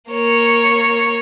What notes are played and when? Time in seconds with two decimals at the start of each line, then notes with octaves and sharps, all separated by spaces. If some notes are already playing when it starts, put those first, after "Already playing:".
0.10 A#3 C#5